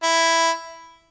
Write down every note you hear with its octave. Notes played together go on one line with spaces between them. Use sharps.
E4